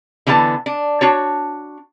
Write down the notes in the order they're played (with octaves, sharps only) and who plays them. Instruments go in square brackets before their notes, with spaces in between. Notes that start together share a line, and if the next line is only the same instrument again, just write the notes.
[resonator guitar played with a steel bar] D3 E3 B3 C5 A5
D4
D4 F#4 C#5